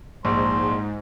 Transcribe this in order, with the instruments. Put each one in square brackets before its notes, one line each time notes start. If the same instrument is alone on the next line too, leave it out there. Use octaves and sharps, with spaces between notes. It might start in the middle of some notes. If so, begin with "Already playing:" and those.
[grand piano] A#1 [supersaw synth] G#2 [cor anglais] C5